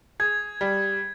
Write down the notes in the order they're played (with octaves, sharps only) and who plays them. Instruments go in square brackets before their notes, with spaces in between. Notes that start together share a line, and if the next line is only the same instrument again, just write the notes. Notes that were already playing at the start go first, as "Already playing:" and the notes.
[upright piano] G#4 [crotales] G#6
[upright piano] G3